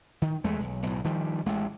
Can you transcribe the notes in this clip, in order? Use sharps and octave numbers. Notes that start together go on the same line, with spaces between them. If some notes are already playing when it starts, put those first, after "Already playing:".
D#3
E2 G#3 A3
B1
B1 A2
D#3 F3 G3
A1 G#3